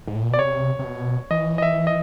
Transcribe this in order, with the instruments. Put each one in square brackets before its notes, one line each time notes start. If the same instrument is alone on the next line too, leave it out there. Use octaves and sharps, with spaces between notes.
[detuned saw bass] G#2
A2
A#2
[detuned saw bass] B2 [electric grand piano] D5
[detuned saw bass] C3 [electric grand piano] C#5
[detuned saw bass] C3
B2
[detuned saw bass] E3 [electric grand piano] D#5
[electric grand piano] D#5
E5
D#5